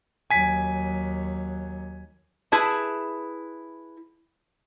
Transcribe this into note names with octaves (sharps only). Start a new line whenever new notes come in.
D#2 F#3 G#5 B6
E4 G#4 B4 A5